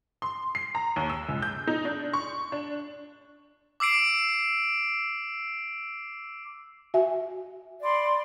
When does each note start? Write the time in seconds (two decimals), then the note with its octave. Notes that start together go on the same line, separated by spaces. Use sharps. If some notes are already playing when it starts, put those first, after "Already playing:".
0.22 C6
0.55 C7
0.75 A#5
0.96 D#2
1.10 E6
1.29 C#2
1.42 G6
1.68 D#4
1.85 D4
2.13 C#6
2.52 D4
3.80 D6 E6 C7 D7
6.94 F#4 E5 G#5
7.82 D5 B5 C6